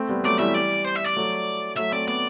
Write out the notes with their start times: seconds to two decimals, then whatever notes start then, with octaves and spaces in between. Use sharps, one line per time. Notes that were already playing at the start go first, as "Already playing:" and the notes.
Already playing: A3 C4
0.09 G3 B3
0.24 F#3 A3 D5
0.39 E3 G3 E5
0.54 D5
0.85 C5
0.96 E5
1.06 D5
1.16 F#3 A3
1.77 F#3 A3 E5
1.92 A3 C4 D5
2.07 B3 D4 D5